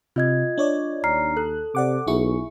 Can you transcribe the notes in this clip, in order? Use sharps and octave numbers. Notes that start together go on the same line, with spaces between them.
C3 F4 D#5 G#6
D4 C#5 D5
D#2 A#5 F6 C7
A4 F#6
C3 D5 F#5 D6
B1 E4 G#4 C#6